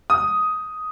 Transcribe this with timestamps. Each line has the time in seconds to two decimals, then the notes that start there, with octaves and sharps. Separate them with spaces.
0.10 D#6